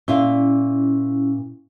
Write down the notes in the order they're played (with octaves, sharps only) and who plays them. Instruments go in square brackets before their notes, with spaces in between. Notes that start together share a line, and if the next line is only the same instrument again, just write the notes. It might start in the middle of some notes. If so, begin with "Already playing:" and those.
[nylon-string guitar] A#2 E5 F5 [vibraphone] C#4 E4